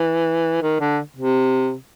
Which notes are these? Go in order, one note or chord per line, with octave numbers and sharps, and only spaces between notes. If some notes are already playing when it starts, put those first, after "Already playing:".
Already playing: E3
D#3
D3
C3